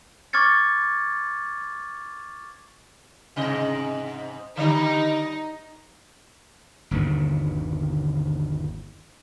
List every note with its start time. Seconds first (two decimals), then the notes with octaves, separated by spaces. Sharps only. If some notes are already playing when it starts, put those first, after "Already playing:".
0.33 C#6 D6 F6 G#6 A6 C#7
3.36 G#2 C3 D#5
4.57 D3 D#3 G3 D#4
6.91 G1 D#2 B2 D3